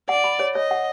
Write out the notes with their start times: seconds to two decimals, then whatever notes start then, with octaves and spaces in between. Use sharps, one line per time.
0.09 D5 F#5
0.24 B5
0.40 C#5
0.55 C#5 D#5
0.71 F#5